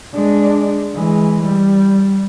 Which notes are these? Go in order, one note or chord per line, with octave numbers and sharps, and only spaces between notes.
G#3 D4
E3 G#3
G3